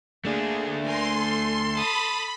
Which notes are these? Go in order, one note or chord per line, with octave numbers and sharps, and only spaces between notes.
A3 A#3 D4 G#4
A#4 G#5 C6
A4
A5 B5 D#6